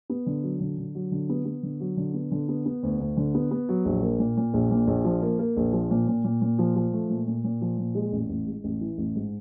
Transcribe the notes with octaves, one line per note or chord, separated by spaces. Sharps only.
B3
D3
F#3
D3
D3
F#3
D3
B3
B3
D3
F#3
D3
B3
D3
B3
B3
D2
D2
D3
B3
B3
F#3
A#1
A#3
A#2
A#2
A#1
A#2
A#1
F3
A#3
A#3
A#1
F3
A#2
A#2
A#2
A#2
F3
F3
A3
A#2
A#2
A#2
F3
A#2
G#3
A1
A1
G#3
A1
E3
A1
G#2